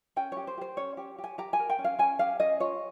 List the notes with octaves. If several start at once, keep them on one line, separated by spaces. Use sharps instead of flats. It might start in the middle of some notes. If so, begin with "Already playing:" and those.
C#4 G5
G4 C#5
C5
G4 C5
C#4 C#5
G4
G4
G#5
G4 A#5
G#5
A#4
G5
C#4
F5
C#4 G#5
G4 F5
C#4 D#5
F4 C#5